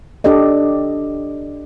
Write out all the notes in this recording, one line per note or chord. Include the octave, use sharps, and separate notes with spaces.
D4 G4 A4 D5 D#5